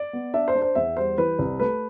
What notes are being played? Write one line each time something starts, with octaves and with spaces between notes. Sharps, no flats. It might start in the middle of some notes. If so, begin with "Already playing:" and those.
Already playing: D5
B3
D4 E5
C5
D4
C5
E2 E5
G3 C5
E3 B4
C2
A3 B4